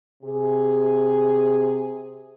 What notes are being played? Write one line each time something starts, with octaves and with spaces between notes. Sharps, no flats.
C3 G#4